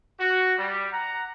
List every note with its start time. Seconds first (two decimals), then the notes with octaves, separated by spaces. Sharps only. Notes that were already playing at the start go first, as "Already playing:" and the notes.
0.20 F#4
0.58 G3
0.93 F#5 A#5